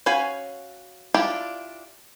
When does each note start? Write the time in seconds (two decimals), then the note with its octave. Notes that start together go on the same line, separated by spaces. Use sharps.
0.06 C#4 F#4 F5 G#5 B5
1.14 D4 E4 F4 G4 D5